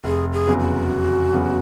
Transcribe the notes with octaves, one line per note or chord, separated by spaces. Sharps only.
F1 G#4
G#4
E2 C#3 F#3 B3
F#4
F1
E2 C#3 F#3 B3